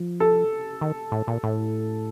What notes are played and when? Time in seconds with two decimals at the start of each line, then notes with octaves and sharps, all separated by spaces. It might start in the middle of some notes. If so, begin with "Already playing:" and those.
Already playing: F3
0.20 A4
0.81 D#3
1.12 A2
1.27 A#2
1.43 A2